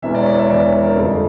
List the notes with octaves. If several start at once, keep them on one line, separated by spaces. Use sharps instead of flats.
E1 E2 E3 E5
D5
C#5
D5
E5
E1 E2 E3 D5
C#5
A#4
G1 F2 C#3 A4